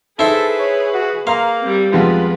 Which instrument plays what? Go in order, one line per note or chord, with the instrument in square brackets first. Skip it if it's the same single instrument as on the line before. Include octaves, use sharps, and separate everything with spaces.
[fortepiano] D#4 [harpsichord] E4 C5 [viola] G#4 B4 [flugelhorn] A4
[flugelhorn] C#5
F#4
[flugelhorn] A#3 [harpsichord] F5 [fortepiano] A#5 C6
[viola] G3 C4
[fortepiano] F2 G#3 B3 [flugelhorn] F4 [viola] B4